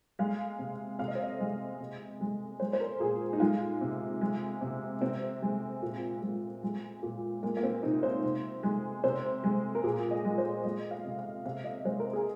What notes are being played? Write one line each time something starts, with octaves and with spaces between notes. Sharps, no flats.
G#3 F5
C3
C3 F5
D#5
C5
D#5
G#3
C3
G#3
G#3 C5
C5
A#4
A#2 G#4
D#4
G#3 F4
C3
G#3
C3
C3 C4
G#3
A#2
G#3
G#3
A#2
G#3 A#3
A#3
C4
C3 D#4
C5
C3
G#3
C3 C5
G#3
A#4
A#2 G#4
D#5
G#3
C5
G#3 D#5
F5
C3
F5
C3 F5
D#5
G#3 C5
A#4
G#4